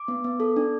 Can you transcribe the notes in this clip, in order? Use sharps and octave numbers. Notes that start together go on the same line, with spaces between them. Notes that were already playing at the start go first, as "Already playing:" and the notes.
Already playing: D6
B3
B3
A4
D4